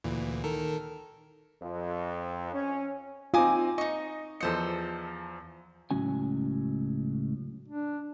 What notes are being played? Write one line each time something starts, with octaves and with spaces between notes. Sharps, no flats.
D2 A#2 E3
D#3 A4 A#4
F2
C#4
C4 D#4 F4 G#5 D6 D#6
D#4 D#5 C#6
E2 F3 A4 C5 D#5 C#7
C#2 A2 F3 F#3 C#4 G#5
D4